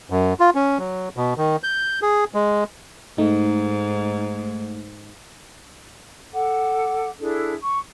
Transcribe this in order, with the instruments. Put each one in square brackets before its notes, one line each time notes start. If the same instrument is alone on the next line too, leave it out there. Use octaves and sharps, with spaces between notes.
[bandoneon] F#2
F4
C#4
F#3
B2
D#3
G6
G#4
G#3
[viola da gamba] G#2 [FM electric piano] A3 D#4
[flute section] A4 F#5 D6
D4 E4 G#4 A4
C#6